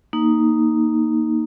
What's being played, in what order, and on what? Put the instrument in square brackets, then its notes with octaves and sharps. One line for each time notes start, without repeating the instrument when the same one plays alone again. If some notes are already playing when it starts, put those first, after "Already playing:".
[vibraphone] A#3 D#4